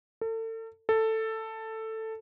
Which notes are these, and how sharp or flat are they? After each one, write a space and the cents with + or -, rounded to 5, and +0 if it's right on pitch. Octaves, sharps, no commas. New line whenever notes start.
A4 +35
A4 +10